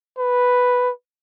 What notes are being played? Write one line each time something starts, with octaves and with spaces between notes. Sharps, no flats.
B4